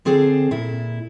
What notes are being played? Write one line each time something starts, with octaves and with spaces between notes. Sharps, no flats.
D3 C4 G#4 A4 C5
A#2 E4